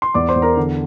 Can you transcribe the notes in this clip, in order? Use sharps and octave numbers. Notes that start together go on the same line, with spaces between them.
C6
E2 D5 D6
C5 C6
E2
A#4 A#5
D3